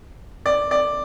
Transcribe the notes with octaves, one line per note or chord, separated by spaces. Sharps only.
D5
D5